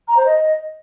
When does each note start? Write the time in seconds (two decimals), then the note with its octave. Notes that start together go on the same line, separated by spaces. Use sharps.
0.08 A#5
0.17 C5
0.26 D#5